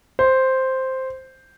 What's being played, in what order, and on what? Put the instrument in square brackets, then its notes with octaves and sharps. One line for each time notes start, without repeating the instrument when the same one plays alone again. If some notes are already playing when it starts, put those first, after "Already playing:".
[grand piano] C5